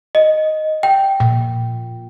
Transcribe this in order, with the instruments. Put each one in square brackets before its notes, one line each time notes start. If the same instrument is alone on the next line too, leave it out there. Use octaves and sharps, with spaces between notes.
[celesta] D#5
G5
[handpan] A#2